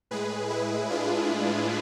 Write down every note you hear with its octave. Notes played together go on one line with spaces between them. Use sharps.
A2 G#3 G#4 B4
E4 G#4
D4 F4